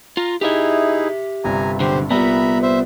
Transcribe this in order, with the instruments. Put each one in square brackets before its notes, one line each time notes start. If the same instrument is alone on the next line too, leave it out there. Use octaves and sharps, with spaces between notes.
[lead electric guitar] F4 [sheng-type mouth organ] A#5
[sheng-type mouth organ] D#4 E4 G#4 [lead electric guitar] G4 E5
[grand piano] G1 G2 C3 [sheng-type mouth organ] G#5 A#5
[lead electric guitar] B1 D3 [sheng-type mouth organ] G4 C5
[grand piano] C2 A#2 G3 [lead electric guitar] B3 [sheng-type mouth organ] E5 A#5 B5
[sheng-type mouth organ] C5 E5